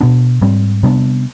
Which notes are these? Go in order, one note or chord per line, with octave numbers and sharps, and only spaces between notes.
B2 B3 D4
G#2 G3 C4
C3 G3 B3 D4